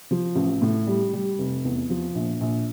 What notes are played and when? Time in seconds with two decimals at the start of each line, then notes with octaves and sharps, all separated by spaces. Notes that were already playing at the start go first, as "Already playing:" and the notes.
0.11 F3
0.36 A1
0.62 A2
0.87 G3
1.13 G3
1.38 F1
1.64 E2
1.90 F3
2.15 A#1
2.41 A#1